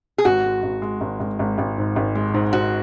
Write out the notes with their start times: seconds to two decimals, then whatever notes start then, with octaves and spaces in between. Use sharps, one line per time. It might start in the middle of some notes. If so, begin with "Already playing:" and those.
0.18 G#4
0.25 G#1 F#4
0.44 G#3
0.63 G#1
0.82 G#3
1.01 G#1
1.20 G#1
1.39 G#1
1.58 G#1
1.78 G#2
1.96 G#1
2.15 G#3
2.34 G#2
2.53 G#2 F#4